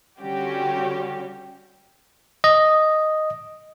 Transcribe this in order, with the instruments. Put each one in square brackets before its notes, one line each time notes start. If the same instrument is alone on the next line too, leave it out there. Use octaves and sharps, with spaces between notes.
[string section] D3 G3 C#4 F#4 G4
[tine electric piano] D#5